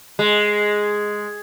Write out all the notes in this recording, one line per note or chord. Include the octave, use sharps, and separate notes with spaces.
G#3